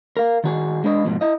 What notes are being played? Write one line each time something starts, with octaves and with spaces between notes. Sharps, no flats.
A#4 F5
D#3 F#4 G#4
G#3 D4 B4 D#5
G#2 B2 F3
E4 D#5